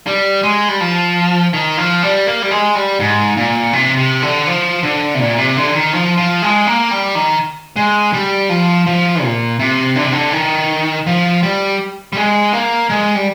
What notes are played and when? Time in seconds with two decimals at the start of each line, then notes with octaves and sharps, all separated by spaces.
0.07 G3
0.43 G#3
0.69 G3
0.80 F3
1.53 D#3
1.77 F3
2.03 G3
2.27 A#3
2.42 G3
2.51 G#3
2.75 G3
3.00 G#2
3.37 A#2
3.73 C3
3.97 C3
4.22 D3
4.47 F3
4.83 D3
5.15 C3
5.19 A#2
5.38 C3
5.57 D3
5.75 D#3
5.93 F3
6.17 F3
6.42 G#3
6.67 A#3
6.91 G3
7.15 D#3
7.76 G#3
8.13 G3
8.49 F3
8.86 F3
9.23 A#2
9.59 C3
9.96 D3
10.04 C3
10.12 D3
10.33 D#3
11.06 F3
11.43 G3
12.13 G3
12.17 G#3
12.53 A#3
12.90 G#3
13.15 G3